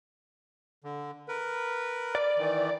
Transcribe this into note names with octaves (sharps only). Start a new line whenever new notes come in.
D3
A#4 B4
D5
D#3 E3